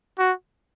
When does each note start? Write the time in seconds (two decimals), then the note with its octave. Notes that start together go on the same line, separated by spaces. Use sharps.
0.18 F#4